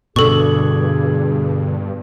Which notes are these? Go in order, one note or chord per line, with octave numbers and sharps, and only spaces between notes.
G2 B2 D3 G#4 A4 C#6